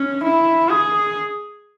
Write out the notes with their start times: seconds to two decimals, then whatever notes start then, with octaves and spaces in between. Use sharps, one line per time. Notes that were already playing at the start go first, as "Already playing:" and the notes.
Already playing: C#4
0.23 E4
0.70 G#4